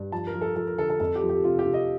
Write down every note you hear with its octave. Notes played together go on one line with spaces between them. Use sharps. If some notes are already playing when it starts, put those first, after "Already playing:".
Already playing: G2
F3 A5
A#4
F3
A4
F3 A4
A#4
D3 A4
A4
F2 A4
G4
F3
G4
C3 F4
G4
C3
D#5